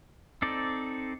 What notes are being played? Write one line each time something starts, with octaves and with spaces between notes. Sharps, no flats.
C4 D#4 A4 D5